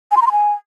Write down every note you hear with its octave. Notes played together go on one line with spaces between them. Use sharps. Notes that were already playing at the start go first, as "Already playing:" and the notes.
G#5
C6
A#5
C6
G#5